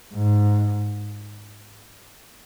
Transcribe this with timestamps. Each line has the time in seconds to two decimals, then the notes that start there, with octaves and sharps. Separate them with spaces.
0.14 G#2